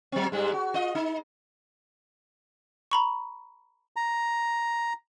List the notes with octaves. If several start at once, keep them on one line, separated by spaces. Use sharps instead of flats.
F#3 C4
G#2 G3 G#3
F#4
F4 D#5
D#4
A#5 B5 C#6
A#5